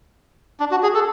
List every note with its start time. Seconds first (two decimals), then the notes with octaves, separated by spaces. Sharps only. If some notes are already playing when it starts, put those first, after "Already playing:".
0.60 D4
0.71 F#4
0.83 G#4
0.95 A4